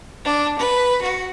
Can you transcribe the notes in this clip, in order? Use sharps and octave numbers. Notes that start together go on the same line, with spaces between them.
D4
B4
F#4